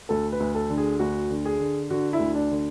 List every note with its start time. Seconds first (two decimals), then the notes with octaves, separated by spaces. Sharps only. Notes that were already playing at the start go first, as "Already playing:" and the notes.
0.09 D2 A4
0.32 B4
0.40 D2
0.55 A4
0.70 D3
0.78 G#4
0.99 D2 F#4
1.30 D3
1.45 G#4
1.59 D3
1.90 D3 F#4
2.13 E4
2.20 D2
2.35 D4
2.51 D3